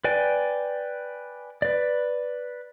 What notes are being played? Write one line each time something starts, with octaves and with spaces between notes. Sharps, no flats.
B4 D5 G5 G#5
B4 D5